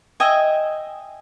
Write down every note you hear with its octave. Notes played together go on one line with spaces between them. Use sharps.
D#5 E5 G5 G#5